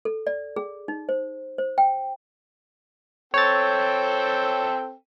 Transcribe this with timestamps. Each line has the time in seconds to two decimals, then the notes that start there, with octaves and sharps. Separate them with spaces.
0.05 A4
0.27 D5
0.56 G#4
0.88 D#4
1.09 C5
1.58 C5
1.78 G5
3.34 C4 A4 C#5 G5 A6